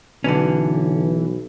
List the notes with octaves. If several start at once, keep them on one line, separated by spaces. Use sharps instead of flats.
B1 D3 E3 C#4